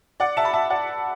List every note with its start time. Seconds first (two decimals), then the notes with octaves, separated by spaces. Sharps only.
0.20 D5 F#5
0.37 E5 A5
0.45 B5
0.53 E5 A5
0.70 D5 F#5